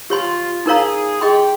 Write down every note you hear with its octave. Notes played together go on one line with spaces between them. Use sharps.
F4 G4 C#5 G#5 C6
D#4 G#4 A#4 C#5 F5 A#5
G4 G#4 D#5 G5 C6